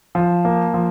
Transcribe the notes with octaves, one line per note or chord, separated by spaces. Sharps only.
F3
A#3
F3